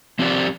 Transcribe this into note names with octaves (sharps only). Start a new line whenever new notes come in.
F3 C4 G4 D5